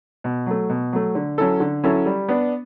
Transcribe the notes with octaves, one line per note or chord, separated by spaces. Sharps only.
B2
F#3 A3
B2
F#3 A3
D3
F#3 C#4 E4 A4
D3
F#3 C#4 E4 A4
G3
B3 D4